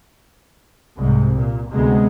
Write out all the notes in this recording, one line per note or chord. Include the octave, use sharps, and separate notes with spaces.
C2 G#2 C3
A#2
D2 C3 G#3 B3